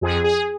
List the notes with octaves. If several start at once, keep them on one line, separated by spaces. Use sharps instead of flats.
F2 G#4
G#4